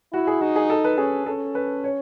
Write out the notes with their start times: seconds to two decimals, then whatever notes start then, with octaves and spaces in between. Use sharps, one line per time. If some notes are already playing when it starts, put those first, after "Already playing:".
0.13 E4 F#4
0.27 G#4
0.41 D#4 F#4
0.56 G#4
0.70 A4
0.84 B4
0.98 C#4 G#4
1.26 C#4 A4
1.55 B4
1.84 C#5